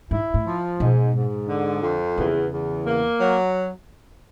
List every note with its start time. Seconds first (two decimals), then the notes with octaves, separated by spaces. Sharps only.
0.11 G#2 E4
0.34 A2
0.46 F3
0.79 G#2 B2
1.15 G#2
1.48 D3
1.82 F2
2.17 E2 C#3
2.51 E2
2.86 A#3
3.20 F#3